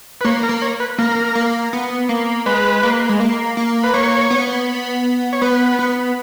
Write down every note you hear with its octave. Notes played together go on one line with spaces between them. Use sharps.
B4
A#3 C#5
A#4
A#3
C#5
B4
A#3 A#4
A#3
B3
A#3
G#3 B4
A#3
G#3
A#3
A#3
B4
A#3 C#5
B3
C#5
B3 B4
B3